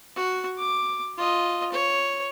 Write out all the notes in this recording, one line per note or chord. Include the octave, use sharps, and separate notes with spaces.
F#4
D6
F4 D#5
C#5